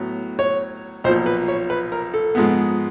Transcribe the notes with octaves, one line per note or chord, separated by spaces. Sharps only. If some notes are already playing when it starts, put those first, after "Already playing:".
Already playing: A2 F#3 B3
C#5
B1 A#2 F3 C5
B4
C#5
B4
A#4
A4
G#2 F3 G#3 B3